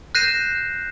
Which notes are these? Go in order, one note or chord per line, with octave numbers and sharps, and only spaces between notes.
F#6 G6 A#6 C7 D#7 E7